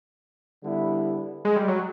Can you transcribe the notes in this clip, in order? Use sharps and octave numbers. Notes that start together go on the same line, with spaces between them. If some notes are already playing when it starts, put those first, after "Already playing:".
D3 G3 B3 E4
G#3
G3
F#3